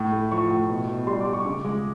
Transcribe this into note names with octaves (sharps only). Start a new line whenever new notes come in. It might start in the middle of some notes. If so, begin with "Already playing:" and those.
Already playing: A2
A3
F3 C#6
A2
B2
B2
G3 C6
D6
G3
C#6
C#3 D6
G#3 D6